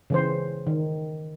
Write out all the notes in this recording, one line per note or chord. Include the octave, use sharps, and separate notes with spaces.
C#3 E3 C5
D#3